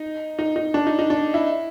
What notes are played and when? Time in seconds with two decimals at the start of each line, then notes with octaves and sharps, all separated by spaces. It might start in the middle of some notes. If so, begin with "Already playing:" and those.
Already playing: D#4
0.39 D#4
0.56 D#4
0.74 D4
0.87 D#4
0.99 D#4
1.10 D4
1.34 E4